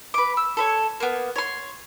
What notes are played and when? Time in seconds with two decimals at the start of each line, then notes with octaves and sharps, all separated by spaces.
0.14 B4 D6
0.37 E6
0.57 A4 B4 C#5
1.00 A#3 B3
1.36 C#5 C6